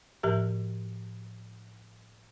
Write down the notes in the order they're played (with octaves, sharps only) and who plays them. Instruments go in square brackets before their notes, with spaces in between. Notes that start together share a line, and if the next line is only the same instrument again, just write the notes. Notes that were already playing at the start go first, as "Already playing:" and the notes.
[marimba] A2 F3 G4 A#4 E5